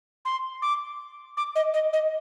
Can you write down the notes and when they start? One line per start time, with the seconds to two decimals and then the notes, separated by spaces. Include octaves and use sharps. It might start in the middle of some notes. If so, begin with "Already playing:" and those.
0.25 C6
0.62 D6
1.37 D6
1.55 D#5
1.74 D#5
1.93 D#5